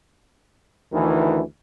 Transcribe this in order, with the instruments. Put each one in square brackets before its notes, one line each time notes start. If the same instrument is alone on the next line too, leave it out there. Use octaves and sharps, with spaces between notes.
[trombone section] D2 D#3 E3